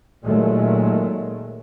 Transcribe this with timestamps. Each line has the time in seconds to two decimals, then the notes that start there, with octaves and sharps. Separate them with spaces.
0.23 A#2 D#3 F#3 G#3 A3